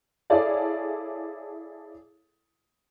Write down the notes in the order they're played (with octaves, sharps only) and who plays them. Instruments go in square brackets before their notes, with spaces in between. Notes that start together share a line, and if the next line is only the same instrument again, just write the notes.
[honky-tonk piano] E4 G#4 A4 C#5 D5 F5